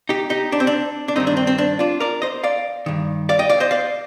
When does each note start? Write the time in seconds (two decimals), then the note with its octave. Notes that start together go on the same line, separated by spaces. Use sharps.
0.09 D#4 G4
0.30 D#4 G4
0.52 D4
0.60 C4
0.67 D4
1.08 D4
1.16 G2 D#3 C4 D#4
1.27 D4
1.37 C4
1.47 C4
1.58 D4
1.79 D4 F4
2.00 A#4 D5
2.22 C5 D#5
2.44 D5 F5
2.86 G2 D#3
3.29 D5 F5
3.39 D#5 G5
3.49 D5 F5
3.60 C5 D#5
3.71 D5 F5